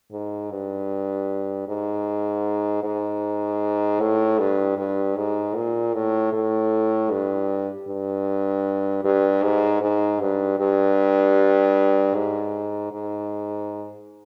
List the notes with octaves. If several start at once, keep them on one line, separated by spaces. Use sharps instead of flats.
G#2
G2
G#2
G#2
A2
G2
G2
G#2
A#2
A2
A2
G2
G2
G2
G#2
G#2
G2
G2
G#2
G#2